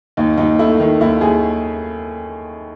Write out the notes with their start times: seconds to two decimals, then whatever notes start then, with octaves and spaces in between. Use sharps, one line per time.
0.17 D#2 D#4
0.38 D#2 D#4
0.59 A3 E4
0.80 D#3
1.01 D#2 E4
1.21 D#2 G#4